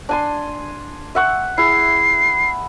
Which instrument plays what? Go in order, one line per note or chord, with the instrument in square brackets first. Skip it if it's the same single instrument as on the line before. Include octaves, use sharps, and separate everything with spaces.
[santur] D4 G#5 C6
E5 F#5 C#6
[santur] E4 G#4 [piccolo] C7